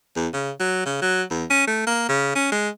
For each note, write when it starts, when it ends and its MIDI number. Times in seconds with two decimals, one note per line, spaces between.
0.16 0.28 40
0.33 0.50 49
0.60 0.85 54
0.85 0.97 49
1.01 1.22 54
1.30 1.45 40
1.50 1.66 61
1.67 1.83 57
1.87 2.08 58
2.09 2.34 49
2.35 2.50 61
2.52 2.69 56